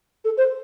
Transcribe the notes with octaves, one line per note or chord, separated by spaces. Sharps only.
A4
C5